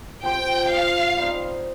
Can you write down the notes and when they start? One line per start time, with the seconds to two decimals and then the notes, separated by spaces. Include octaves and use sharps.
0.23 F3 C4 G4 C5 G5
0.71 F5
1.17 G3 C4 D#4 C5